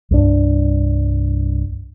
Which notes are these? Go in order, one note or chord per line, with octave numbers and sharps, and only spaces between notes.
C2 G2 D4